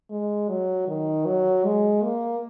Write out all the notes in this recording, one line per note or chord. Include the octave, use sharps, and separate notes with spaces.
G#3
F#3
D#3
F#3
G#3
A#3